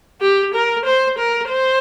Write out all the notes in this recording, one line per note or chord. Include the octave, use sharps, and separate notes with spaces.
G4
A#4
C5
A#4
C5